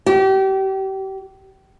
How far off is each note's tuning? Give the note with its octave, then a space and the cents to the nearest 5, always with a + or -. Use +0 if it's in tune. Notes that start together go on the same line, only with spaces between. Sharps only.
G4 -30